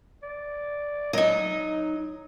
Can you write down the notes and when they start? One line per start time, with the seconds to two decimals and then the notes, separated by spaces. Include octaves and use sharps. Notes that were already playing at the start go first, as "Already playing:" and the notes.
0.23 D5
1.13 F#3 D#4 D#5
1.42 F#3